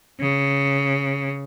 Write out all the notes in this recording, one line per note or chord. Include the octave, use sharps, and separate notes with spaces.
C#3